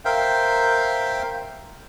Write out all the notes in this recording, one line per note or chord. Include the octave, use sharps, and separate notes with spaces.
A#4 C5 E5 F5 G5